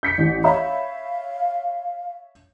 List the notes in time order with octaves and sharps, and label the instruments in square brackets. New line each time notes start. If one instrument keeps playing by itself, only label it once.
[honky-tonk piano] G6 B6 C#7
A1 E3
[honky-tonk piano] C#5 E5 B5 [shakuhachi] F5